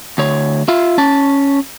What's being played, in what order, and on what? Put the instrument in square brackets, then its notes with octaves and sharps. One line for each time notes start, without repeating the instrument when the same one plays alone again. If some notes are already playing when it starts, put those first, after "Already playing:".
[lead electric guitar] D2 C#5
F4 E5
C#4 A5